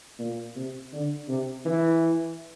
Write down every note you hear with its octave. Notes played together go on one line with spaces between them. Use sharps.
A#2
C3
D3
C3
E3